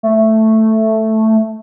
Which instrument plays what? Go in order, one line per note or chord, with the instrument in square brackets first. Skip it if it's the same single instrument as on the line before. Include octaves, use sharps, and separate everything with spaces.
[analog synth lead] A3